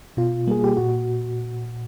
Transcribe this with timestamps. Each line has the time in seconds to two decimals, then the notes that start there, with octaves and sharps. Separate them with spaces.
0.17 B2 F4
0.47 G3 A#3 G#4
0.64 G4
0.77 A#2 F#4